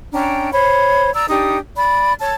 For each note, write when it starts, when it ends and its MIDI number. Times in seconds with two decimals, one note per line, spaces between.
0.12 0.49 61
0.12 0.49 62
0.12 0.49 79
0.12 0.49 82
0.52 1.12 72
0.52 1.12 73
0.52 1.12 83
1.13 1.25 74
1.13 1.25 82
1.13 1.25 88
1.27 1.57 62
1.27 1.57 63
1.27 1.57 67
1.27 1.57 87
1.76 2.13 74
1.76 2.13 83
2.19 2.34 73
2.19 2.34 81